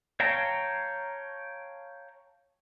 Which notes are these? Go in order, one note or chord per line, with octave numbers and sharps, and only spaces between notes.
C#5 F5 G5 A5 A#5